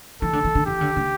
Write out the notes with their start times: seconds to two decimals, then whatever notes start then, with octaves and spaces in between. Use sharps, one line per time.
0.22 E3 A4
0.33 D3
0.45 E3
0.55 D3
0.66 E3 G4
0.81 D3
0.97 D3